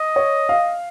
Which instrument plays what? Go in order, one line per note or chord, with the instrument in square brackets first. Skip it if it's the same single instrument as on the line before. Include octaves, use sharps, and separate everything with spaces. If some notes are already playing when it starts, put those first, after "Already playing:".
Already playing: [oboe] D#5
[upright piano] C#5
F5